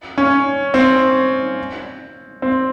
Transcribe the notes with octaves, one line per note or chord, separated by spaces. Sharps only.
C#4
C4
C4